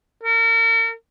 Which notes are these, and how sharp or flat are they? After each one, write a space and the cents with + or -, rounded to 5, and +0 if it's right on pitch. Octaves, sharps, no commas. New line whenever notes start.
A#4 -35